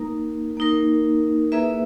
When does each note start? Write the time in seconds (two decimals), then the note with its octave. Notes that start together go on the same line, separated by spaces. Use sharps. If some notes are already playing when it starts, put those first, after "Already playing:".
Already playing: A#3 D#4 A#4
0.57 A#3 D#4 A#4
1.52 A#3 E4 G#4 B4 E5